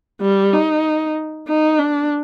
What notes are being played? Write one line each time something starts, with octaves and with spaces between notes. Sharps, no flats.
G3
D#4
D#4
D4